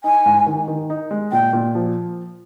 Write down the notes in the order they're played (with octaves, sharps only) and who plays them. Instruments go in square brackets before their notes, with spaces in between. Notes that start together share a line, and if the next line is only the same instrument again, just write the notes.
[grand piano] D#4 [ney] G#5
[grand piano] G#2
D#3
D#3
D#4
G#3
[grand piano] A#2 [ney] G5
[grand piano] A#2
F3